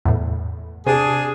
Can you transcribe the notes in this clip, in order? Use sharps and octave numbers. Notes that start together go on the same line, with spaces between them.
E2 A2
C3 D4 G#4